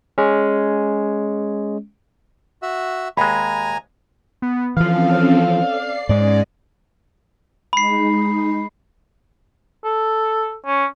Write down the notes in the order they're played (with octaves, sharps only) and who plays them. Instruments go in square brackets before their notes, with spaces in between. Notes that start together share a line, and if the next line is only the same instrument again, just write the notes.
[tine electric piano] G#3 C#4
[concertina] F#4 E5
[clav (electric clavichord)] D#2 G#3 [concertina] G#5 A#5 [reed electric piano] B5
[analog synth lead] B3
[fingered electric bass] E3 F3 [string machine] C4 C#4 A4 [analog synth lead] F5
[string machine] D5 C7
[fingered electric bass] G#2 G#3 [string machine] C#4 D#5 G#5 [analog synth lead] D5
[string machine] G#3 D#4 [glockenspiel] B5 C7
[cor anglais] A4
C#4